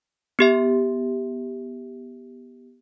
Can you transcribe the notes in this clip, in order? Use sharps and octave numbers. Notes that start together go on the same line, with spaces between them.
B3 G4 E5